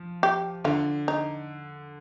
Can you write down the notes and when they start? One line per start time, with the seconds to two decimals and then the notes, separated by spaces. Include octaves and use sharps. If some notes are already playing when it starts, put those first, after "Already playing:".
Already playing: F3
0.23 G4
0.64 D3 F4
1.08 D#4